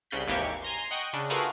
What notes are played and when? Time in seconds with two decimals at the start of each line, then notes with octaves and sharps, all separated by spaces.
0.11 C2 C#3 F#6 G6 B6
0.27 G#1 D#2 E3 A#3 G4 C#6
0.62 G#5 A#5 C6
0.91 D#5 F#5 G5 C#6
1.13 C#3 D4
1.30 A3 F4 F#4 G#4 A#4 B4